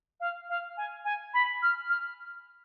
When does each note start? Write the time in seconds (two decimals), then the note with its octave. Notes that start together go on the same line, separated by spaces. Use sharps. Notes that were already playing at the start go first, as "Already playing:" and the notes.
0.20 F5
0.49 F5
0.77 G#5
1.04 G#5
1.33 B5
1.62 F6
1.89 F6